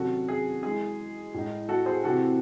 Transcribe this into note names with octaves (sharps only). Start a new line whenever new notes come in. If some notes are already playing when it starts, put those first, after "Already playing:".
Already playing: C3 D#3 F#3 C#4 F#4 A4
G#4
E3 G#3 D#4 G#4
A2 G#3 D#4
F#4 A4
G#4 C5
C3 E3 C4 F#4 A4